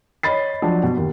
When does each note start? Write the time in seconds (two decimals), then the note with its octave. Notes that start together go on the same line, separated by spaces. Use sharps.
0.23 C#5 D#5 B5 A6 C7
0.62 F3 F#3 D4 A5
0.83 B2
0.97 D#2